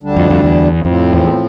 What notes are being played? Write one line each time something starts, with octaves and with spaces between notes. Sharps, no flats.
D2 D3 G3 D4
F2
F2
E2
F2 A2 F3 C4
E2